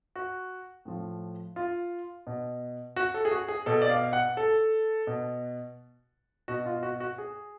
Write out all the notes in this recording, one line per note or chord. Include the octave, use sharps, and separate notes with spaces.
F#4
A2 F3
F4
B2
F#4
A4
G#4
F#4
G#4
B2 A4
D5
F5
F#5
A4
B2
B2 F#4
F4
F#4
F#4
G#4